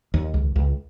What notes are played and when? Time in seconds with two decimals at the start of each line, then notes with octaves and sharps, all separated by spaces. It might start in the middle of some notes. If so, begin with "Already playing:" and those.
0.14 D#2
0.34 C#2
0.56 C#2